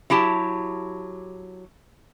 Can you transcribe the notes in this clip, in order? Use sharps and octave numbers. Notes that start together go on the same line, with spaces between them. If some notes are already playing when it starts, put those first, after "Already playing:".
F#3 E4 G4 A5